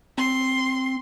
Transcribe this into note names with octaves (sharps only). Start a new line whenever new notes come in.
C4 C6